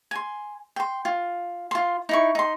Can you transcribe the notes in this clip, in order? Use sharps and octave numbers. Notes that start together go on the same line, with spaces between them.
G#5 C6
G5 C6
F4
F4 C6
D#4 E4 C#6
D#4 C6